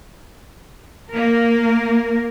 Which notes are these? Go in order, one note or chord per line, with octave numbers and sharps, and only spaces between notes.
A#3 A#4